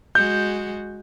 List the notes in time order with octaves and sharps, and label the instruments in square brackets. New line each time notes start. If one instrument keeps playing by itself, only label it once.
[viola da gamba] G#3 F#4 [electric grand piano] G6